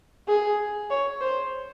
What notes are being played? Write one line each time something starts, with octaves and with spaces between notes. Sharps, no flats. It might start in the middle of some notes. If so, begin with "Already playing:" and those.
G#4
C#5
C5